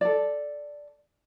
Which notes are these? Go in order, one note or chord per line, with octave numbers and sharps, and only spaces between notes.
A4 D5